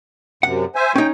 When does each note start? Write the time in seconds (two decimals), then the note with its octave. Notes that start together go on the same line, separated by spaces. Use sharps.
0.43 F#2 C3 F#5
0.75 C5 E5 G#5
0.96 C#4 D#4 G5